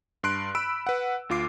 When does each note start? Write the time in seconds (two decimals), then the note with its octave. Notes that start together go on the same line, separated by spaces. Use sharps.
0.23 G2 C6 F#6 D7
0.55 B5 E6 D7
0.87 B4 F#5
1.29 D2 F4 D6 C7